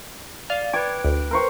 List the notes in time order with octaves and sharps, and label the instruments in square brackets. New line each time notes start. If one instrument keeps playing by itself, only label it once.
[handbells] D5 [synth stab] F5
[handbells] B4 G5 [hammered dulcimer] D6 [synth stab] G#6
[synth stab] D2
[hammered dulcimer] A#4 C5 C#6